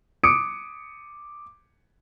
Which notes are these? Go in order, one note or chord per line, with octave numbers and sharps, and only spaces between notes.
D6 D#6 C#7 D7